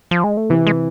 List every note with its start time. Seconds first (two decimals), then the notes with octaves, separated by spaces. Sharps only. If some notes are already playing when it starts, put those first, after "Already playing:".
0.11 F3
0.24 G#3
0.37 A3
0.49 C3 E3 B3
0.67 G#3